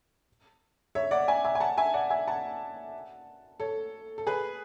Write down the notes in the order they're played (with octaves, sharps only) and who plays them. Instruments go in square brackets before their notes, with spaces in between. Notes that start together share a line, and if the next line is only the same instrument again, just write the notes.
[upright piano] C#5 E5
D5 F#5
E5 G#5
E5 G#5
G#5
F#5 A5
E5 G#5
D5 F#5
E5 G#5
F#5 A5
A4 C#5
A4
G#4 B4